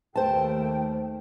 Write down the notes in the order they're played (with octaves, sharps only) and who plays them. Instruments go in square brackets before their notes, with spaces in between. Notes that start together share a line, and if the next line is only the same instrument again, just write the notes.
[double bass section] D#2 A3 [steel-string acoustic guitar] C5 A5 [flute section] G5